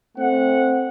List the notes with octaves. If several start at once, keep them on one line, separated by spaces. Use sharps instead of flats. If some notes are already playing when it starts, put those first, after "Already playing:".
A3 C4 F#5